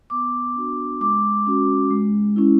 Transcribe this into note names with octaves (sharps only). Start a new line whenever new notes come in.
B3 D6
D4 F#4
G#3 D6
C#4 F#4
G#3
C#4 E4